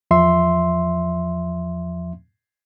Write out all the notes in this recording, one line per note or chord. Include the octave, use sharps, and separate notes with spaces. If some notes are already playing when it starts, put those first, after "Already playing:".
E2 F3 E5 C6